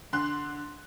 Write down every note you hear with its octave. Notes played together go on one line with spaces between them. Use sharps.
D3 C6 F#6